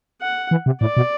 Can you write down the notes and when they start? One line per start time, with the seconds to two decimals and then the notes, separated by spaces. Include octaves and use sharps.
0.21 F#5
0.51 E3
0.66 C3
0.81 A2 D5
0.97 B2